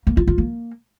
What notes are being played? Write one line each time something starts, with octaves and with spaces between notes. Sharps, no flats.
A#3
F4
F4
A#3